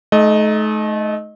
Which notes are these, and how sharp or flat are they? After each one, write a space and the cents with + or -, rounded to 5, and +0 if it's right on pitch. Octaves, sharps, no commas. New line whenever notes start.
A3 -35 D#4 +0 D#5 +0